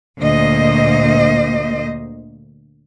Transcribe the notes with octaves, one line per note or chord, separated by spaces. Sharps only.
D2 A#2 A#3 C5 D#5